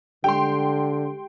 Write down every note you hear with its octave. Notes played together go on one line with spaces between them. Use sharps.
D3 G#3 G4 G5 C6